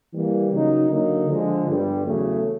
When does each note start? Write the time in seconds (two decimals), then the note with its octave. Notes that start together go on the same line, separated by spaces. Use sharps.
0.12 E3 G3 A#3
0.51 C#3 F#3 A#3 D#4
0.89 D3 F#3 A#3 D#4
1.28 D3 F3 G#3
1.66 G1 G2 D3 G3
2.04 E2 C#3 F#3 A3